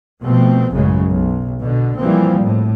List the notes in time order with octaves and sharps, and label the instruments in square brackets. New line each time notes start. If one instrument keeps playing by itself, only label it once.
[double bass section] B2 F3 A3 C4
A1 F#2 C#3 G#3
B1
B2 D3
E3 F3 G3 A#3 C4
A2